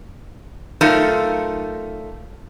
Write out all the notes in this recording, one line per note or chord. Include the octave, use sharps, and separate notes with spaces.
F#3 A3 D#4 F4 A4 A#4